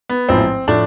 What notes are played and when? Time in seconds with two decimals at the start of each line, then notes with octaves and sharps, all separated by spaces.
0.09 B3
0.29 A1 G#2 F3 B3 C4 E4
0.67 A2 F3 A3 D4